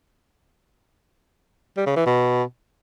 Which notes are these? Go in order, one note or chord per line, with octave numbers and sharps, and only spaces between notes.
G3
C#3
E3
B2